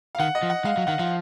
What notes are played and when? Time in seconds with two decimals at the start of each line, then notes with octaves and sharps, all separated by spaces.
0.15 F5
0.20 D#3 F#5
0.35 D#5
0.43 F3
0.50 F#5
0.65 G#3 F5
0.77 F#3
0.87 D#3 F#5
0.99 F3 F5